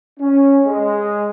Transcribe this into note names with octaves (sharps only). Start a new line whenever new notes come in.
C#4
G#3